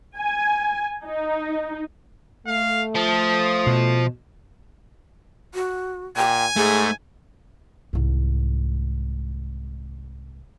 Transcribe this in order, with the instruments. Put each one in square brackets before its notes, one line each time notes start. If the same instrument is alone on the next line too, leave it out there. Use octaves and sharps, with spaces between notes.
[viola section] G#5
D#4
[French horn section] A3 [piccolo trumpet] F5
[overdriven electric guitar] F3 [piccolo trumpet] D#6
[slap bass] B2
[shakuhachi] F#4
[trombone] A#2 [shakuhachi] G5 [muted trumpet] G#5
[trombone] G#2 [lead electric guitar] A3 [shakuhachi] G#4
[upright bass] C2 G#2